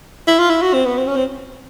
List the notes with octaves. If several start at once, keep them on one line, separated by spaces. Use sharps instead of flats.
E4
F4
E4
F#4
C4
B3
C4
C#4
C4